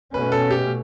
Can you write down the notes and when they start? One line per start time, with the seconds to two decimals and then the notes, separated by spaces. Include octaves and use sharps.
0.14 B2 A3 C#4 B4
0.32 A4
0.51 G4